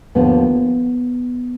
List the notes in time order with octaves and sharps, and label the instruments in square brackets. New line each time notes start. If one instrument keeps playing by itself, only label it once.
[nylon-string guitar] D#2 D3 F3 B3